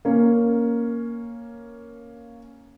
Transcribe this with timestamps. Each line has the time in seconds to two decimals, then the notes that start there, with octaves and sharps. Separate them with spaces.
0.05 A#3 C#4